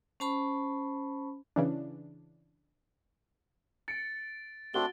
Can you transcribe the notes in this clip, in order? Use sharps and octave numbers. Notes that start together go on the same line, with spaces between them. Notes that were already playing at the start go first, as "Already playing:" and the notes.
C#4 C5 A5 B5 C#6
C#3 E3 D4
A6 C#7 D7
A3 C4 D4 F#4 G7